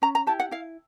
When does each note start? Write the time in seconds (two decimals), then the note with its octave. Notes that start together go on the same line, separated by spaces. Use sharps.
0.02 C#4 A#5
0.15 A#5
0.27 E4 G4 A5
0.40 F#5
0.51 E4 F5